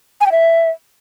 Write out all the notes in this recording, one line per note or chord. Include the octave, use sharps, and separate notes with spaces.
G#5
G5
E5